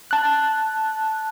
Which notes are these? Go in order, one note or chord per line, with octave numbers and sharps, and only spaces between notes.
A5 F#6